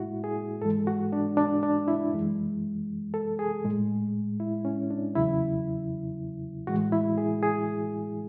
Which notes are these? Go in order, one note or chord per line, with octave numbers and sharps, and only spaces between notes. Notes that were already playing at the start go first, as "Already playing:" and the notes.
Already playing: A2 G#3 E4 F#4
G#4
G#2 E3 G#3 A4
F#4
D4
D4
D4
E4
F#2 E3 G#3
A4
G#4
A2 G#3
E4
C#4
D4
E2 C#3 F#3 E4
A2 E3 G#3 F#4
E4
G#4
G#4